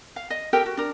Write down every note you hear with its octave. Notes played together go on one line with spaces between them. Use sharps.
F5
D#5
G4 A4 A#4 G5
F#4
D4 A#4